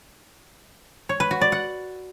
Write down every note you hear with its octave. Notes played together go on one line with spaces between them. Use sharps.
C#5
B4
F#4
D5
F#5